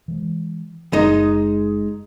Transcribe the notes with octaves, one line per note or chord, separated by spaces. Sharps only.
E3 G#3
F#1 G#3 D#4 D#5